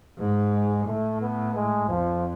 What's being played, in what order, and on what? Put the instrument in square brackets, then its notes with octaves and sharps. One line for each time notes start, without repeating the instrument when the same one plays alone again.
[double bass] G#2
[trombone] G#3
[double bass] A2 [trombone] A3
[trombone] B3
G#3
[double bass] F2 [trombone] F3